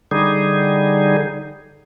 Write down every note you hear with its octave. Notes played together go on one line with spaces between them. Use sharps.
D3 G3 D#4 G#4